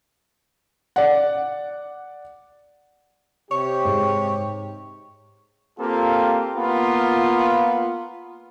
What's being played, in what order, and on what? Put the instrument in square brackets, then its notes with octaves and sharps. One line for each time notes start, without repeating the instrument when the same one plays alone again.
[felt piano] D5 F#5
[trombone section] C3 G4 [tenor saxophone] C#5
[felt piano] G#2
[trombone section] A#3 C4 F4 G4 A4
A#3 B3 F4